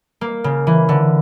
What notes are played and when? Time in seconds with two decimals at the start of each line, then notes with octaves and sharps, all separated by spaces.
0.21 A#3
0.44 C#3
0.67 E3
0.89 D3